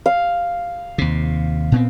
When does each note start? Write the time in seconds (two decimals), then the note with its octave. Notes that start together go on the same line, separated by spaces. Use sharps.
0.06 F5
0.98 D#2 C3
1.72 A#2 B3 C4